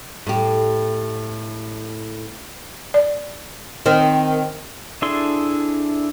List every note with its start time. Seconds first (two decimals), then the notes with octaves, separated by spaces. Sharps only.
0.27 A2 G4
2.94 D5
3.86 D#3 C4
5.02 D4 E4 G#4 A4 C6